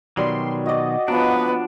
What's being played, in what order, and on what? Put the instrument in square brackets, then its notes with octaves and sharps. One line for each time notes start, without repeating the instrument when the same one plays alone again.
[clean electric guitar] B2 D#3 F#3 [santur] G3 [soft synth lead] C6
[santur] F#4 D5 [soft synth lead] D#5
[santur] F3 F#3 [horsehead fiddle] B3 B4 [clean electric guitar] D4